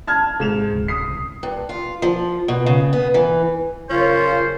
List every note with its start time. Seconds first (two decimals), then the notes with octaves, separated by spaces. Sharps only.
0.07 A5 F6 G#6
0.40 G#2 C3 E7 F7
0.73 D1
0.88 D#6 C7
1.08 C2
1.43 G2
1.69 F4
2.02 F3
2.48 B2
2.66 C#3
2.93 B3
3.14 E3
3.90 F#1 C#4 F4 C5